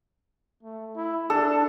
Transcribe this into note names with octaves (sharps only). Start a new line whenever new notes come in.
A3
E4
D4 A4